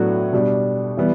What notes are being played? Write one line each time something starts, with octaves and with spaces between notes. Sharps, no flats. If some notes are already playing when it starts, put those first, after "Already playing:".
Already playing: A2 F#3 B3 D4 F#4
B2 G3 D4
E3 G3 B3